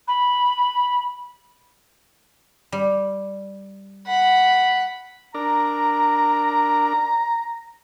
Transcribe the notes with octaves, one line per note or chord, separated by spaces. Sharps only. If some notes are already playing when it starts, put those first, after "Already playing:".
B5
G3
F#5 B5
D4 A#4 A#5